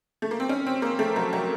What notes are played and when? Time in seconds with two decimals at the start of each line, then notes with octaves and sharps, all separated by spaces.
0.22 A3
0.31 A#3
0.40 C4
0.49 C#4
0.67 C4
0.82 A#3
0.99 A3
1.16 F#3
1.33 F#3